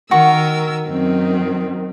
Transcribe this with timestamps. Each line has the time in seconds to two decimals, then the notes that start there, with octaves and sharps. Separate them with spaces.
0.11 D#3 F#4 A#4 C#6 E6
0.89 F#2 D#3 C4